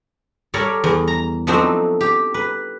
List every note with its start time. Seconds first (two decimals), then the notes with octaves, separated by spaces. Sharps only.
0.54 G3 A4 A#4 C#5 D5
0.84 E2
1.07 A#5
1.47 F3 F#3 A3 C4 D4 D#4
2.01 G4
2.34 B4